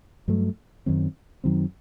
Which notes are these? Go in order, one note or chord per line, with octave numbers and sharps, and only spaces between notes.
G2 F#3 A3
F#2 D#3 F#3 C4
F#2 D#3 F#3 C4